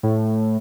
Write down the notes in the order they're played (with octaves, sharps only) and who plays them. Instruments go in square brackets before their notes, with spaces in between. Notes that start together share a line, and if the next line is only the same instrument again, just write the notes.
[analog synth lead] A2